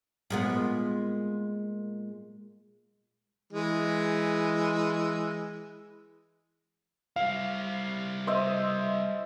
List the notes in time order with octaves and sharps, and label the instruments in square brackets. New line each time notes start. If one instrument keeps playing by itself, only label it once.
[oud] A#2 G#3 B3
[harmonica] E3 G#3
[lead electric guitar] G3 E4 [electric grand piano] F5
[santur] C5 D#5 E5